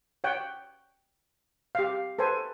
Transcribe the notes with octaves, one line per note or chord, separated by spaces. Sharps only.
C#5 F#5 G5
G4 F5
A4 B4 C5 G#5